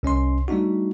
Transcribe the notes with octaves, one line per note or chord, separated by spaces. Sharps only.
C2 C#4 D#5 C6
G3 A3 D4 D#4 F#4